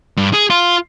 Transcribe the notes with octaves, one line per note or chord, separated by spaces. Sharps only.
G2
G#4
F4